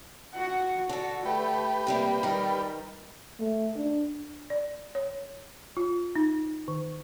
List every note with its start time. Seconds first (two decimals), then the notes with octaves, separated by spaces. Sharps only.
0.34 F#4 F#5
0.89 D3 F#4 A4
1.25 A3 G4 B4
1.87 C3 G3 A#3
2.23 D#3 G3 A#4
3.39 A3
3.77 D4
4.50 D5
4.95 C#5
5.77 F4
6.15 D#4
6.68 D#3